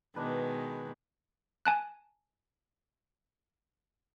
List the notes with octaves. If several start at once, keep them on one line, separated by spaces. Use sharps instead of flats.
B2 D#3 G#3 D4 B4
G#5 A5 F#6